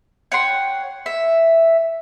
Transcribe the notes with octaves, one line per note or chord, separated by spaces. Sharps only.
C#5 F#5 G5 C6
E5